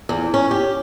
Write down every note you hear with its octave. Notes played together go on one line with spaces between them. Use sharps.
E2
C#4
G4